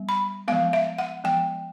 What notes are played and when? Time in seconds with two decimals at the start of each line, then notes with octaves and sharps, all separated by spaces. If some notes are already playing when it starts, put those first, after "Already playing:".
Already playing: G3 B3
0.09 B5
0.48 F3 G#3 B3 F5
0.73 E5
0.99 F#5
1.24 F3 G#3 B3 G5